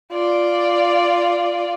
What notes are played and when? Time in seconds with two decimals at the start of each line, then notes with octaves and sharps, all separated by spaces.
0.11 F4 D5